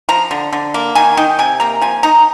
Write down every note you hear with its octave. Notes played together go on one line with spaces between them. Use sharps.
F3 A#5
D3
D3
A#3
D#3 G#5
D#4 G5
C3 G#5
A#3 A#5
F3 G#5
D#4 A#5